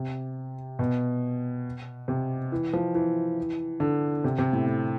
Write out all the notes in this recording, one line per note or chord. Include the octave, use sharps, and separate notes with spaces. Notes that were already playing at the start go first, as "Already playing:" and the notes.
Already playing: C3
B2
C3
E3
F3
E3
D3
C3
C3
A2
A2